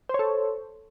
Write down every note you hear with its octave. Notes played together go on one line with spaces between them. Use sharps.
A4 C5 C#5